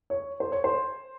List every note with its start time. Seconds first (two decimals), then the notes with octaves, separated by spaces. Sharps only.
0.10 C#5
0.40 C5
0.52 C#5
0.64 C5